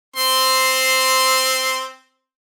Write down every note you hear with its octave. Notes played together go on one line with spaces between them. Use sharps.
C4 C6